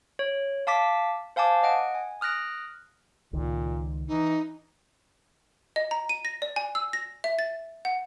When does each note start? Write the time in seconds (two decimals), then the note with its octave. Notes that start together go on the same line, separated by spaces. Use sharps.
0.19 C#5
0.67 F5 A5 D6 B6
1.36 C5 F5 G#5 A5 D6
1.63 D#5 F#5 D7
1.95 G#5
2.21 D#6 F6 F#6 A#6 D7
3.33 C#2 A#2 D#3
4.08 E3 D#4
5.76 D#5
5.91 A#5
6.09 D#7
6.25 A#6
6.42 D5
6.56 G#5
6.75 E6
6.93 A#6
7.24 E5
7.39 A6
7.85 F#5